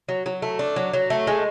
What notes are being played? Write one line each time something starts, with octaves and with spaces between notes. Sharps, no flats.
F#3
F#3
A3
D4
F#3
F#3
A3
G#3